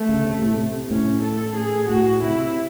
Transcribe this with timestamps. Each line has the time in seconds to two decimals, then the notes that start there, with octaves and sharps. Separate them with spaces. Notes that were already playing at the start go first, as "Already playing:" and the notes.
Already playing: A3
0.09 C#3
0.25 C3
0.42 A2
0.58 C3
0.90 A2 C#4
1.23 A4
1.57 G#4
1.89 A2 F#4
2.22 C3 E4